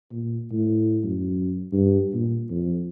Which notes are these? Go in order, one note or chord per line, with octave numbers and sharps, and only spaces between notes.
A#2
A2
F#2
G2
A#2
F2